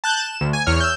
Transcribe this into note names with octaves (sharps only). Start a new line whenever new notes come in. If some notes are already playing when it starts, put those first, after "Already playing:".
A5 F#6 G6
E7
D2
G#5
E2 C#5 F6
E6 G6